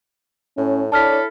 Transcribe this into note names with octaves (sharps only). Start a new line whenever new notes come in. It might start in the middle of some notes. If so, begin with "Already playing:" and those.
A2 C#4
D4 E4 A4 C#5 A5 F6 B6